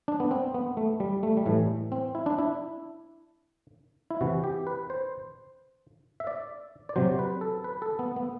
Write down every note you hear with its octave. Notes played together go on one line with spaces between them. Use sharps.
D4
B3
C4
B3
A3
G3
A3
G3
A2 E3 A3
C4
E4
D4
E4
E4
C3 E3 F#4
G4
B4
C5
E5
D5
D5
C3 F#3 C5
B4
A4
B4
A4
B3
B3